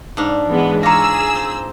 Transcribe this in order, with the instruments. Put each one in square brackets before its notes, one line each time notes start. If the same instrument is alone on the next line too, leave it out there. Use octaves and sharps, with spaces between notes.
[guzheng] G#2 D4 F5
[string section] E3 G#3 B3
[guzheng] F4 C#5 [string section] G#4 E6 [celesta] A#5 D6 A#6
[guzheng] C4